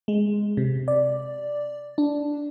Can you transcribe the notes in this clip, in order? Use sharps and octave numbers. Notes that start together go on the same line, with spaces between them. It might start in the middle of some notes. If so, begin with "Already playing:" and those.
G#3
C3
D5
D4